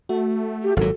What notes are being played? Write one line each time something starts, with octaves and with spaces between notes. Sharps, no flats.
A3 F#4
G4
G#1 A#2 F#3 A4